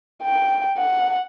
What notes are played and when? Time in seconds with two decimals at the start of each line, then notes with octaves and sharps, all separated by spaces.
0.23 G5
0.78 F#5